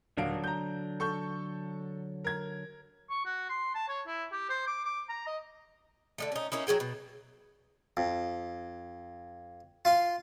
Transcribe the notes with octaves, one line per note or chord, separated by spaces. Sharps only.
D#1 D3 F#3 D4 F5 D7
A#5 G6
A4 C#6 G6
A#4 G#6
C#6
F#4
C6
A5
C#5
E4
G4
C5
D6
D6
A#5
D#5
D3 G#3 A3
C#4 D#4
A#3 C#4 D#4 E4
F#3 A#3 G#4 G5
B2
F2
F4 F5 C6